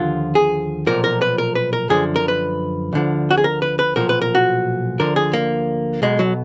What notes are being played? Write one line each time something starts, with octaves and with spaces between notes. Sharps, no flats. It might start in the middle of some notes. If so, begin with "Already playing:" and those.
Already playing: D#2 D3 F3 F4
G#4
B1 A#2 F3 A#4
A#4
B4
A#4
B4
A#4
F#2 D3 F3 G#4
A#4
B4
D2 D3 F3
F#4
G#4
A#4
B4
B4
B1 A#2 F3 A#4
B4
A#4
F#4
D2 D3 F3 A#4
G#4
A#3
B1 B2 G#3
F#3